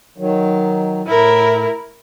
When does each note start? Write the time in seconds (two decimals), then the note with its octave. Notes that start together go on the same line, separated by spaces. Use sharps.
0.18 D#3 F#3
1.07 A2 E4 A#4